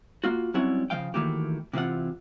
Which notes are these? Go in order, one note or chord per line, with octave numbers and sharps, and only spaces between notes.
A#3 F4 F#4
F#3 G3 C4 C#4 E4 F#5
C#3 F3 F5 G5
D#3 E3 A3 A#3 F#4 G4
C3 E3 C4 F4 F#5